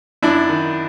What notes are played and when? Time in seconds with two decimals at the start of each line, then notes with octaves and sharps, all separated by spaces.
0.22 F#2 D4 E4
0.49 D#3